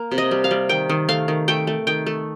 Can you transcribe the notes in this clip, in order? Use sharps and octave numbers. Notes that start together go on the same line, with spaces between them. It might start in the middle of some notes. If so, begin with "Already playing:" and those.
Already playing: A#3
C3
D#5
G3
F5
G3
D#3 G5
D#3
A3 F5
D#3
A3 G5
A3
D#3 G5
A3